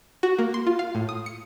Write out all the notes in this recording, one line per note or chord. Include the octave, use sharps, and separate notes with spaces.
F#4
A#3
C6
F4
F5
A2
D#6
C#7